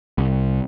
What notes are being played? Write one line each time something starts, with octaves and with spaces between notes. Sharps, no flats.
C2